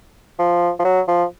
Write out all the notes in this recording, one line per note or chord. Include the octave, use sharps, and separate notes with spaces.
F3
F3
F#3
F3